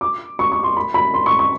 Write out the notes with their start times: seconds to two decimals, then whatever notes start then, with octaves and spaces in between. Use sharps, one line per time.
0.01 D6
0.39 C#6
0.52 C#6
0.63 C6
0.77 B5
0.94 B5
1.14 C6
1.26 C#6
1.39 C#6